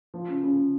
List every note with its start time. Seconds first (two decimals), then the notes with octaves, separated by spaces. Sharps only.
0.14 F3
0.28 C#3
0.43 C#3
0.57 C#3